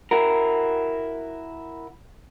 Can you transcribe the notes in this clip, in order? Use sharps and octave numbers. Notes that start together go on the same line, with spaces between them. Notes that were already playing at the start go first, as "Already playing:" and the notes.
E4 F#4 A#4